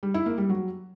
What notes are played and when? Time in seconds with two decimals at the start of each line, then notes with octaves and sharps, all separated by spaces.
0.03 G3
0.14 E4
0.26 A#3
0.38 G3
0.49 F#3